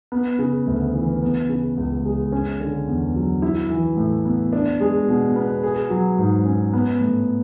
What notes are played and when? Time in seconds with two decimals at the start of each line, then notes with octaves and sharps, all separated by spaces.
0.12 B3
0.39 C#3
0.67 D2
0.95 E3
1.23 B3
1.49 C#3
1.77 C#2
2.05 G#3
2.32 C#4
2.60 D3
2.87 E2
3.15 F#3
3.42 E4
3.70 E3
3.97 A2
4.25 B3
4.53 D4
4.80 G#3
5.08 B2
5.36 B3
5.63 G#4
5.90 F#3
6.18 G#2
6.45 C#4
6.73 B3
7.01 A2